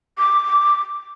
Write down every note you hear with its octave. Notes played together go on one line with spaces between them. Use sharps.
D6